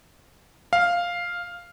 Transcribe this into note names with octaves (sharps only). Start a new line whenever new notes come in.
F5